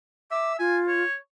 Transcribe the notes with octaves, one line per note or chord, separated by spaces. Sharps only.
E5 D6
F4 G#5
C#5